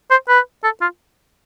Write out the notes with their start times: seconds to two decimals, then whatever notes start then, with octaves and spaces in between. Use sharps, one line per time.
0.11 C5
0.29 B4
0.64 A4
0.81 F4